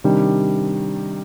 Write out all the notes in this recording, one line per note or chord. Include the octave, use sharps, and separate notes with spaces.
C3 D#3 G3 D4